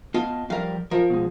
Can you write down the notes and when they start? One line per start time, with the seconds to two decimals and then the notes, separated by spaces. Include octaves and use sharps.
0.14 B3 F4 D#5 A5
0.50 F3 G3 A#4 F5
0.91 F3 A#4
1.10 B2 G#3